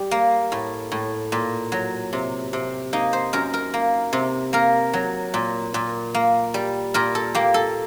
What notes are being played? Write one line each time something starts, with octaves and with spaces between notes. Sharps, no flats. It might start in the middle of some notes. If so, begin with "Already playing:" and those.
Already playing: G3 G4
A#3
A2
A2
A#2
F#3
C3
C3
A#3 D#4
C5
F#2 A#4
A#4
A#3
C3
A#3 A#4
F#3
A#2
A#2
A#3
G3
A#2 A#4
A4
A#3 G4
A4